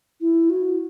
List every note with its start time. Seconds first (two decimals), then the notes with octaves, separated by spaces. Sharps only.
0.20 E4
0.49 F#4